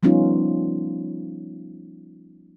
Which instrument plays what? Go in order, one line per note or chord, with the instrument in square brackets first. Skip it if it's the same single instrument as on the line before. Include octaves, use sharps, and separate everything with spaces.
[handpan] F3 G3 B3 C#4 D#4 F4